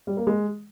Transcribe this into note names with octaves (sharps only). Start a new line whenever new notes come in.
G3
A#3
G#3